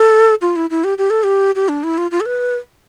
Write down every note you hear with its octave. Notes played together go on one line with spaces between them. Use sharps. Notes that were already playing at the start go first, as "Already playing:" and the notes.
Already playing: A4
F4
E4
E4
G4
G4
A4
G4
G4
D4
E4
F4
F4
A4
B4